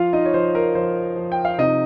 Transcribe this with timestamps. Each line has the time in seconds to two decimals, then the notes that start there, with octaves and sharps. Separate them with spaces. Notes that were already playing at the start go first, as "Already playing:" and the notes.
Already playing: F3 F4 F5
0.13 D#4 D#5
0.25 C#5
0.34 F3 C5
0.55 A#4
0.75 F3 C5
1.16 F3
1.32 G5
1.45 F5
1.58 C3 D#4 D#5